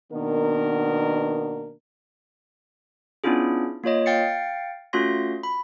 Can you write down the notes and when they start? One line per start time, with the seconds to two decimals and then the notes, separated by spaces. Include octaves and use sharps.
0.12 B2 D#3 A#3 B3 D4 A#4
3.24 B3 C#4 D4 E4 F4 G#4
3.84 A#3 F4 C#5 D#5
4.06 F5 G5 A6 C7 C#7
4.93 A3 C#4 F4 F#4 C6 A#6
5.43 B5